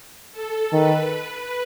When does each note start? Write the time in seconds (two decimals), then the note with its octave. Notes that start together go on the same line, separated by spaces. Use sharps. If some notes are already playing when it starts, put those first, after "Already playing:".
0.32 A4
0.73 D#3 B4
1.14 B4